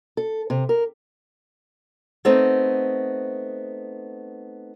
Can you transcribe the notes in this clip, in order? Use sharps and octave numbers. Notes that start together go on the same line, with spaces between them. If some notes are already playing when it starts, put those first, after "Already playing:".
A4
C3
A#4
A3 B3 C4 D#4